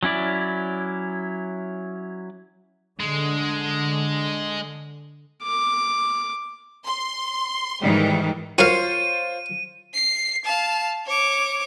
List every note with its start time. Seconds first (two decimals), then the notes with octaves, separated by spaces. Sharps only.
0.03 F#3 C#4 E4 D5
3.00 D3 G#3
5.43 D6
6.85 C6
7.81 G#2 D#3 E3 G3
8.58 F4 F#4 A#4 C5 C#5 F5 C6 D#7
9.94 C7
10.45 F5 A5
11.06 C#5 D6